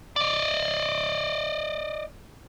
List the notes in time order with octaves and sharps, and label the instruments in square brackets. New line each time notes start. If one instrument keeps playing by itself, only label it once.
[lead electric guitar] D5 D#5